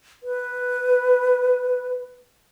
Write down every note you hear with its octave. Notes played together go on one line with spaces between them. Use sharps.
B4